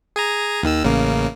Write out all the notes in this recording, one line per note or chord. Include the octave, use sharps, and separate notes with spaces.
G#4 G#5 A#5
D#2 D#3 E6
A1 C#3 A#3